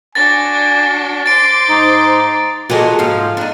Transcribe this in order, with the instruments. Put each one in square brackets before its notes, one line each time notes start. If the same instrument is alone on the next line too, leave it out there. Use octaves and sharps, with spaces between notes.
[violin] D4 F#4 [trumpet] G#5 [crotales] A6 A#6
[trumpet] C5 [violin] C6 D6 [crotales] A6 D7
[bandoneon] G#2 D#4
[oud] A#2 G#3 [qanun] F#4 A4
[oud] G#2 F3 [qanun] F5
[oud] D4 D#4